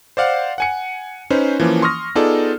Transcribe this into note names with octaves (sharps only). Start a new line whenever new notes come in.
C5 D5 F5 F#5
F#5 G#5 C#7
C#4 D#4 B4 C5
E3 F3 A#3 C#4
C6 C#6 D#6 F6 A#6
B3 D#4 F4 G#4 A4 D5